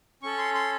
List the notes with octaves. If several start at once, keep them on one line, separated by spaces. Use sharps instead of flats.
C#4 A4 C#6
C6
C6